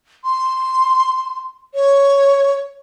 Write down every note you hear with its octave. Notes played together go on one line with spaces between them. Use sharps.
C6
C#5